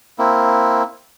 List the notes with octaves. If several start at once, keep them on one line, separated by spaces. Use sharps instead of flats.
A#3 C4 E4